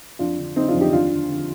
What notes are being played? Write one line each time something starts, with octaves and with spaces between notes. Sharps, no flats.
F2 D4 F4
D3
D3 C4 D#4
D4 F4
F2
D#4 G4
D#2 D4 F4
D3
D3